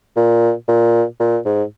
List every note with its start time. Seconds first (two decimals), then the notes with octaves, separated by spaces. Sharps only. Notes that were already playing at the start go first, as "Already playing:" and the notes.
0.16 A#2
0.68 A#2
1.20 A#2
1.45 G#2